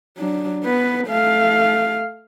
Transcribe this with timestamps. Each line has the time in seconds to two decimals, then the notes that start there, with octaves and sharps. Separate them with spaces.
0.18 F#3 D4
0.64 B3 B4
1.07 A3 F5